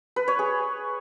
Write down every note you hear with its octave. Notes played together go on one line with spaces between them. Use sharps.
B4
C#5
G#4